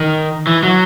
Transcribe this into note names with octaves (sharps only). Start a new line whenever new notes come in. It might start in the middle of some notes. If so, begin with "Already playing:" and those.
Already playing: D#3
E3
F#3